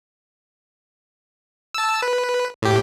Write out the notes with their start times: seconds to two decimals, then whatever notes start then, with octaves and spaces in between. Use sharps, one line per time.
1.74 A5 E6
2.02 B4
2.62 A2 G4